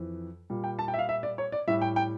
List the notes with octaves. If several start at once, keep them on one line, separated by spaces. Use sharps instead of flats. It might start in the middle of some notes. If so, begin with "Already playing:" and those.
Already playing: F2 E3
A#2 G3
G5
A5
G5
E5
F5
E5
D5
C#5
D5
A2 G3 E5
G5
G5